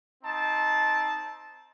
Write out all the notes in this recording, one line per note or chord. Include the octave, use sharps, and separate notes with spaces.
C4 D#4 A5